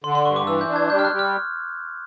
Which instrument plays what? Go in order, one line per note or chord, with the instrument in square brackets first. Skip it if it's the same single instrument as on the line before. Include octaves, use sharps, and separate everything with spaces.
[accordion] D3 [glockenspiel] C6
[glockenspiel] C6
[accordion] G2 [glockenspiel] C#6
[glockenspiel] D6
[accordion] E3 [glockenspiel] E6
[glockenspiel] G6
[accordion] D4
[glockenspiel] G#6
[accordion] G3 [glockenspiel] G6
[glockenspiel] F6
F#6
[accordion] G3
[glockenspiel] F6